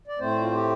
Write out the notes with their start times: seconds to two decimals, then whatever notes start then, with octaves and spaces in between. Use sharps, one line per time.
0.08 D5
0.19 A2 A3 C4 C5
0.41 F4
0.53 G4